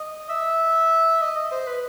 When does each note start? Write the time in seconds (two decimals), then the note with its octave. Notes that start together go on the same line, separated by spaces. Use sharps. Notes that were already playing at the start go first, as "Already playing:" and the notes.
Already playing: D#5
0.30 E5
1.22 D#5
1.37 D#5
1.51 C5
1.67 B4